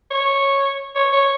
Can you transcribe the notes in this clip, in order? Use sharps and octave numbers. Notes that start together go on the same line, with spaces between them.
C#5
C#5
C#5